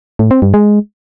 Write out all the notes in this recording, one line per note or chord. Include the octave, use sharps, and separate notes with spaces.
A2
C4
G2
G#3